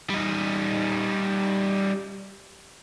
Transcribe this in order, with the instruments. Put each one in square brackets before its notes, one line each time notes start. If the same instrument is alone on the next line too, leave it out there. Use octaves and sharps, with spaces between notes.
[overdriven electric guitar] G3 D#4